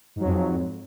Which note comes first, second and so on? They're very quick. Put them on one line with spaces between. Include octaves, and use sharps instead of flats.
G#2 F#3 F2